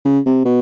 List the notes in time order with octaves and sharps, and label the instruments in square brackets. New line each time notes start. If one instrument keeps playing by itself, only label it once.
[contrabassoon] C#3
C3
B2